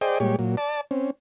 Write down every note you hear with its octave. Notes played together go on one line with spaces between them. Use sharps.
G#4 C5 D5 D#5 G5
A#2 G3 G#3 G4 C#5
A#2 F#3
D5 A5
C4 C#4